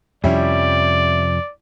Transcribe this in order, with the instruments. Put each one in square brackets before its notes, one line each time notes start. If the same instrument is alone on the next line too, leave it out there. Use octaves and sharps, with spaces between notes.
[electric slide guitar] F2 C3 F3 [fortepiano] G3 C#4 E4 [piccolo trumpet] D5